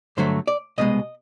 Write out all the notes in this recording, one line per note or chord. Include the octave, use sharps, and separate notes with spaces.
G2 D3 F#3 A3 C5
D5
C2 B2 G#3 D#5